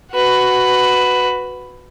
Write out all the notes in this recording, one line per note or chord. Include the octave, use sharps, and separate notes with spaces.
F#4 B4